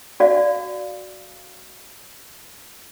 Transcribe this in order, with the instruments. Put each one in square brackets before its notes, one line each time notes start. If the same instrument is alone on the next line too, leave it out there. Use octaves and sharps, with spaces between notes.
[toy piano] F#4 D5 F5